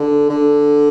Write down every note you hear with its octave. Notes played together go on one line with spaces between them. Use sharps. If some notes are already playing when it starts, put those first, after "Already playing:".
Already playing: D3
D3